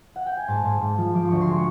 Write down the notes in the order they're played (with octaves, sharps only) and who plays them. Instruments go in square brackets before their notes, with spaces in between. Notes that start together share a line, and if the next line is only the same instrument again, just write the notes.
[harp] F#5
G5
G#5
G#2 A5
G#2
G#2
F3
F3 D6
D2 C#6
C6
G#3
C#6